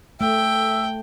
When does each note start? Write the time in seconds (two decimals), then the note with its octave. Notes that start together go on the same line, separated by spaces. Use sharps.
0.21 A3 E5 G5